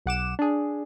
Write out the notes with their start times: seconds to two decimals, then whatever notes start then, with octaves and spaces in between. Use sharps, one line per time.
0.06 B1 F#5 D6 E7
0.39 D4 G#4